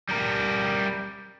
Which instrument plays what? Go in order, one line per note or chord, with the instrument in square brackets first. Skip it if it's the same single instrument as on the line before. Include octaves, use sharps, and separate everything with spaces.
[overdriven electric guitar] G3 A#4